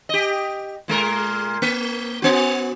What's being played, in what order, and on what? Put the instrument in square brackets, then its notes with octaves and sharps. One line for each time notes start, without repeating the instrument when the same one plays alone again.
[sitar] G4 D#5
A#2 G#3 A#4
A#3
B3 F#4